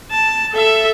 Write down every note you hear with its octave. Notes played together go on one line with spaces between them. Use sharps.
A5
A4 E5